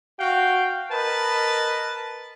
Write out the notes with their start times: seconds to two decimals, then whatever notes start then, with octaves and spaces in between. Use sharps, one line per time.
0.19 F#4 F5 G5
0.92 A#4 B4 D#5 A5